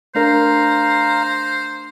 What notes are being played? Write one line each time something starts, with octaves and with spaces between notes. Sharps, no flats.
A3 D4 A#4 C5 F5 A#5